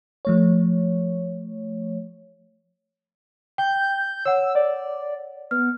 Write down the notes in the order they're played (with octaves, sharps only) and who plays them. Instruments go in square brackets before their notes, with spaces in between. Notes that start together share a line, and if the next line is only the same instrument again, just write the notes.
[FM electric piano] F3 A3 C#5
[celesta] G5 [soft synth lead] G6
[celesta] C#5 F#5 [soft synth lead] E6
[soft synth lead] D5
[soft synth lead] B3 [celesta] F6